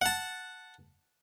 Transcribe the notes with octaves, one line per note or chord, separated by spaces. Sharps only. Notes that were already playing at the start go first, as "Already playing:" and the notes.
F#5 A5